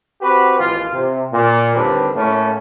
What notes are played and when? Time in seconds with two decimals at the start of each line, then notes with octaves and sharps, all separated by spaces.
0.21 C4 F#4 G4 B4
0.60 G#1 D#2 E3 F4
0.92 C3
1.32 A#2
1.75 D#2 D3 G3 C4 B4
2.15 A2 A3 A#3 C#4